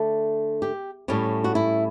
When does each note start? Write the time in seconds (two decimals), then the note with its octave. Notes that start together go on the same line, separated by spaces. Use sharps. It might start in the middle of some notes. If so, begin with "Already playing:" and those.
Already playing: D3 A3
0.62 G4
1.08 A2 G3 C#4
1.44 F#4
1.55 E4